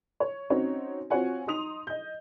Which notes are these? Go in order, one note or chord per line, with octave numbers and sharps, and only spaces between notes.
C#5
C4 C#4 D#4 F#4 C#5
C4 F4 F#4 C#5 F#5 G#5
D#4 C6 D#6 F7
D#5 G6